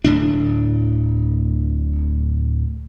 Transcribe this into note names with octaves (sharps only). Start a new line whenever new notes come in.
D1 A2 D4